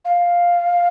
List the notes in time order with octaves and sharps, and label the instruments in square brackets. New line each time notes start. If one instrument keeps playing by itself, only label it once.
[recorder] F5